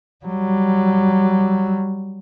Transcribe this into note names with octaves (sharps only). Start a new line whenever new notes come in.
F#3 G3